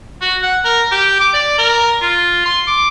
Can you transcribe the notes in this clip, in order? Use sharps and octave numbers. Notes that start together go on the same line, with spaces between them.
F#4
F#5
A#4
G4
D6
D5
A#4
F4
C6
D6